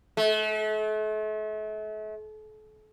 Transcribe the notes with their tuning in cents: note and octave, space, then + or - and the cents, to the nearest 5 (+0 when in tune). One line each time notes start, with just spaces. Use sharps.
A3 -40